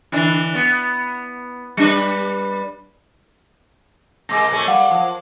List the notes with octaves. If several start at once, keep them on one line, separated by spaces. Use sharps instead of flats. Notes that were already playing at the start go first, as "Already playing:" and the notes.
D3 E3 D4
B3
G3 D4 B4
C3 G#3 A#3 D6 A#6
A#2 A3 C#4
G3 F5 F#5 D6
F3